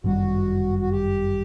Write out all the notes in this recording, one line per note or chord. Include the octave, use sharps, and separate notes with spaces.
G1 F#2 D#3 G3 F#4
F#4
G4